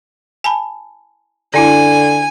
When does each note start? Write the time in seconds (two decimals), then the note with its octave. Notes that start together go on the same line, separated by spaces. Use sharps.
0.44 G#5 A5 B5
1.54 D3 D4 E4 F#4 G#5